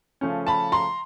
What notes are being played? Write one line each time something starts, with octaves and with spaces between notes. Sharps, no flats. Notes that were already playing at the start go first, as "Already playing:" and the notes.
C#3 F3 A3 C#4
A5 B5
A#5 C6